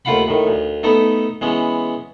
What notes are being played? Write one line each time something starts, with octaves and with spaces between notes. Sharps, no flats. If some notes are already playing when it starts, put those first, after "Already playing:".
D#2 A3 F4 F5 F#5 B5
A2 D#3
D2
A3 B3 D#4 A4
E3 G#3 B3 C#4